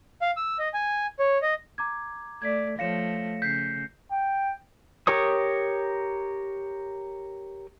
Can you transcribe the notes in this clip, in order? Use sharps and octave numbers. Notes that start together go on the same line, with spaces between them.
F5
E6
D#5
G#5
C#5
D#5
A#5 D6 G#6
A3 D5 G#6 B6
F3 A3 C#5 F5 A#6 C#7 E7
C#3 G6 B6 C7
G5
G4 A#4 C#5 D#6